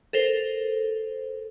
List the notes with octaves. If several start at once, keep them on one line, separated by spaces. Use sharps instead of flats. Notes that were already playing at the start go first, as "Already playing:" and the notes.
A4 A#4 C5